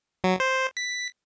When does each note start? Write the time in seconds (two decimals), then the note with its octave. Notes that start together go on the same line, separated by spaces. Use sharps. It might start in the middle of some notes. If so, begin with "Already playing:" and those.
0.24 F#3
0.40 C5
0.77 B6